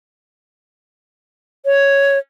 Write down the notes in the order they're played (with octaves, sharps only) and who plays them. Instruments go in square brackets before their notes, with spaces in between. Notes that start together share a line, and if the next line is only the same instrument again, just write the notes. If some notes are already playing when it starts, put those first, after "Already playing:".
[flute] C#5